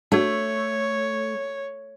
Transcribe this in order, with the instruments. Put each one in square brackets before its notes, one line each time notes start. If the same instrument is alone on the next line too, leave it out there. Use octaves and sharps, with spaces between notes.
[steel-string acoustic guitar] A3 [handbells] D4 F#4 [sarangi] C#5